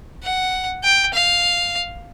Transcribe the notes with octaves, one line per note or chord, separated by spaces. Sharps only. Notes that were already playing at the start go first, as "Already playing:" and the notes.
F#5
G5
F5